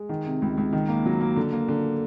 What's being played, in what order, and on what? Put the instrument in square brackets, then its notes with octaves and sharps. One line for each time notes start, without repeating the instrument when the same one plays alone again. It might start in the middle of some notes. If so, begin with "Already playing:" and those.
Already playing: [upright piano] G#3
D#3
C3
C#2
C#2
D#3
A#3
F#3
A#3
D3
A#3
D3